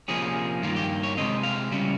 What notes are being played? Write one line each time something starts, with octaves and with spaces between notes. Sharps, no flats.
C3 F3 A#3 C#4 G#4
G2 D#3 A#3 F4
G4
C#5
C3 F3 G#3 C4 D#5
F5
C#3 G3 C#4